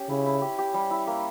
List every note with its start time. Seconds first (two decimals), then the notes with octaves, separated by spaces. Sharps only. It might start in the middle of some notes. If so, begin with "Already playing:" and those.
Already playing: C#4 G4
0.09 C#3 E4
0.26 E4
0.42 G4
0.59 G4
0.74 G3
0.90 E4
1.07 A#3